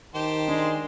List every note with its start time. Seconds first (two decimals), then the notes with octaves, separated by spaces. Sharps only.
0.15 D#3 G4 C5 A5
0.49 G#3 D4